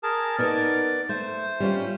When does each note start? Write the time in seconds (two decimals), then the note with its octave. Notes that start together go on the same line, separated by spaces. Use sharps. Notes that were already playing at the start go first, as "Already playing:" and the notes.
0.03 G#4 A#4 A5
0.38 B3 D#4 A#4 D5
1.09 A3 C5
1.60 G3 C#4 F4